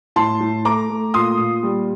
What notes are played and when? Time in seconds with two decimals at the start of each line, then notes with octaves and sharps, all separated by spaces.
0.16 A2 A5 C6
0.40 A2
0.65 A3 A#5 D6
0.90 A3
1.14 A#2 C6 D#6
1.38 A#2
1.63 G3